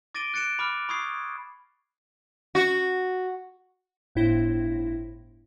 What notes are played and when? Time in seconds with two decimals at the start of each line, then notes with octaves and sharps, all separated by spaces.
0.14 D6 A6 A#6 D7 D#7 G7
0.34 F#6 A6 C#7 D7 E7
0.59 B5 D6 F6
0.89 B5 C#6 D#6 G#6 C7
2.55 F#4
4.15 G1 A2 E4 C5 A#6